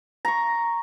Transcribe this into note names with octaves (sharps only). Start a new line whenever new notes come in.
A#5 C#6